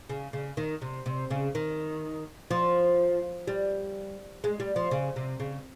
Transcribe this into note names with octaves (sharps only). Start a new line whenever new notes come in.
C#3
C#3
D#3
C3
C3
C#3
D#3
F3
G3
G#3
G3
F3
C#3
C3
C#3